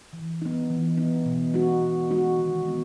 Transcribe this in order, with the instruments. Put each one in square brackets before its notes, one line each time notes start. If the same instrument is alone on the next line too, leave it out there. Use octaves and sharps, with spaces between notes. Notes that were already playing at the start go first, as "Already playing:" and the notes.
[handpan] E3
B3 D#4
E3
B3 D#4
B2
G#3 D#4 F#4
B2
G#3 D#4 F#4
D#3
G#3 B3